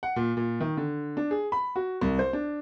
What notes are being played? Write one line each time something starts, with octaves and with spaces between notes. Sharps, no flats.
F#5
A#2
A#2
D#3
D3
D4
G#4
B5
F#4
C2
C5
D4